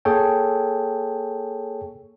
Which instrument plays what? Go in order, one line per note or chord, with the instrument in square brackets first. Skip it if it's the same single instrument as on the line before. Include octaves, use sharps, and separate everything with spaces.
[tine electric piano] A#3 G#4 A4 C#5 G5